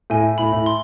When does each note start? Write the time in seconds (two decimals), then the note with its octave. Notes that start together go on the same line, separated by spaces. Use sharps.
0.10 A2 G#5
0.38 A2 B5
0.52 A2
0.66 C6